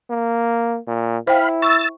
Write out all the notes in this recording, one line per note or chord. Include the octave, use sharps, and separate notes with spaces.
A#3
A#2
E4 C5 F5 G5 B5
C#6 E6 A6